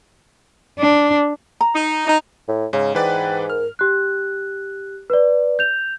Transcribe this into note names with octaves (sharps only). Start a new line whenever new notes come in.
D4
A#5
D#4
D#4
A2
G#2 C#3
G#2 E3 B4 D5 G5
A#4 F6
G4 F#6
B4 D5
G6 F7